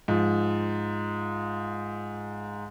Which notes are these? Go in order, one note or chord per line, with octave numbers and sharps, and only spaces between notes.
G#2 F3 F4